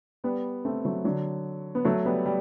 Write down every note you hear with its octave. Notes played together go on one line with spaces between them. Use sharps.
G3 B3
A3 C4
F#3 A3
D3 F#3
B3
F#3 A3
G3 B3
G3